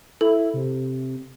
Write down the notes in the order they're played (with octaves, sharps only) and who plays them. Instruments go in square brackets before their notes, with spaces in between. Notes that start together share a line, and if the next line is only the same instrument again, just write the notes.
[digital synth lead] E4 [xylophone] A4
[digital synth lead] C3